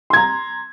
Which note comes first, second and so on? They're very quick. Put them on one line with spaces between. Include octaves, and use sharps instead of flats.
C6 G#6 A#5